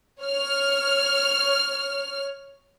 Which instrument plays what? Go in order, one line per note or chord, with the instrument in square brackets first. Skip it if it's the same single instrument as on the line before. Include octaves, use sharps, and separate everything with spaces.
[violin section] C#5 F6